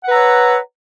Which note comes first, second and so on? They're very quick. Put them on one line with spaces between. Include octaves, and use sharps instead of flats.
F#5 B4 A#5 E6 C#5